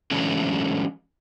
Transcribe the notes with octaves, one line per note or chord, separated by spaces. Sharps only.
E3 F#3 G#3 A3 C#4 D4